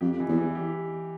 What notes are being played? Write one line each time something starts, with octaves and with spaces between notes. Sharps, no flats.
F2 G4
E3
E2
E3
G4